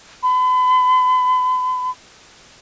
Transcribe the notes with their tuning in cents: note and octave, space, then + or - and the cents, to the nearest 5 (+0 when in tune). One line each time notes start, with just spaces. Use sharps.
B5 +40